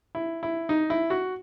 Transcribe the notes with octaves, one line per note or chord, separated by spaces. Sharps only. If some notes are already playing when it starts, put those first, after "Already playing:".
E4
E4
D#4
E4
F#4